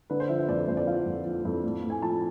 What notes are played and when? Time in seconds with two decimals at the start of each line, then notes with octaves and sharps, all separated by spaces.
0.10 D3 B4
0.20 C5
0.29 F3 E5
0.39 E5
0.49 F2 D5
0.59 D5
0.68 F2 C5
0.77 D5
0.87 F3 F5
1.06 F2
1.26 F3
1.45 F2
1.64 A2
1.83 A2
1.90 G#5
2.02 F3 A5